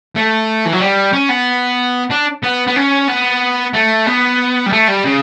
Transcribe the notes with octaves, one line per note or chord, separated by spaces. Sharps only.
A3
E3
F#3
G3
C#4
B3
D4
B3
B3
C#4
B3
A3
B3
G3
A3
G3
C#3